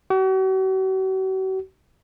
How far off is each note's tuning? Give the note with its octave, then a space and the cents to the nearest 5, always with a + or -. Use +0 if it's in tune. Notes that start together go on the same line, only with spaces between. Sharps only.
F#4 +45